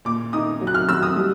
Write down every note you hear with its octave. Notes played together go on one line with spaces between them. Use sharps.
A#2 D6
D#4 D#6
F#3
F#6
F6
F#3 E6
D#6
G3